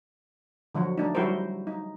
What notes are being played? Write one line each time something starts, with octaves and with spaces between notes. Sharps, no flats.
D3 F3 F#3 F#4
A3 D4 D#4
F#3 G3 E4 F#4 A#4 C5
D#4